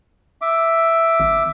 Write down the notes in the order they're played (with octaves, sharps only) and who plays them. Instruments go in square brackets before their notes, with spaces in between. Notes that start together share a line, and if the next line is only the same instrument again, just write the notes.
[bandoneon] E5 D6
[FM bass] G#1